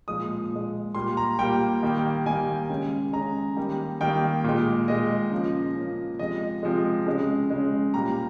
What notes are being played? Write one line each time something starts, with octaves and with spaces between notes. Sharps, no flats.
A#2 F3 G#3 D#6
A#2 F3 G#3
A#2 G3 A#3 C6
A#5
A#2 G3 A#3 G5
D#3 G3 A#3
D#3 G3 A#3 G#5
C#3 G#3
C#3 G#3 A#5
D#3 G3 A#3
D#3 G3 A#3 G5
A#2 G#3
A#2 G#3 D#5
C#3 F3 A#3
C#3 F3 A#3
C3 F3 G#3 D#5
C3 F3 G#3
C#3 G#3
C#3 G#3
A#2 G3 A#3 A#5